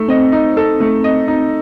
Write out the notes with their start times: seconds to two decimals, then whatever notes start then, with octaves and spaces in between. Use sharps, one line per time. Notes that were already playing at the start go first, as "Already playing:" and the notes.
Already playing: A3 D#4 A4
0.09 C4 D#5
0.32 D#4
0.57 A4
0.80 A3
1.04 D#5
1.28 D#4